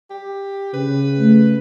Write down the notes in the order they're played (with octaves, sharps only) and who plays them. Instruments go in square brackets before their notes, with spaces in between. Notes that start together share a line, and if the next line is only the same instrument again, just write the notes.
[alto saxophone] G4
[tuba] C#3 [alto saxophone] B4
[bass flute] A3